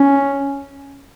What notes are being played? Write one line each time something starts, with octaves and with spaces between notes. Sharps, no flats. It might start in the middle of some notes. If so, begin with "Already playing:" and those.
Already playing: C#4